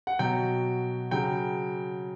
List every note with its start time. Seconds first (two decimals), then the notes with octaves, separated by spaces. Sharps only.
0.07 F#5
0.19 B2 F#3 G5
1.11 C#3 F#3 G5